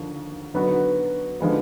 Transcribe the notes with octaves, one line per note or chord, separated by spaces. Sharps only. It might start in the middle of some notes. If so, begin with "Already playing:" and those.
Already playing: D#2 D3 F3
D3 F#3 B3 D#4 F#4
D3 F3 G#3 B3